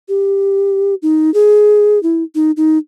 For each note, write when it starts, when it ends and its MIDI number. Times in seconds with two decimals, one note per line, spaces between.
0.09 0.95 67
1.02 1.33 63
1.34 2.01 68
2.03 2.23 64
2.35 2.51 63
2.57 2.78 63